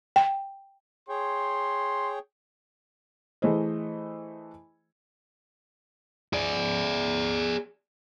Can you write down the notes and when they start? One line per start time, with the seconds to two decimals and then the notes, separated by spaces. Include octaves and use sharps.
0.16 G5
1.09 G#4 C#5 G5 C6
3.42 E3 A3 G#4 C5 D#5
6.33 G#4 D5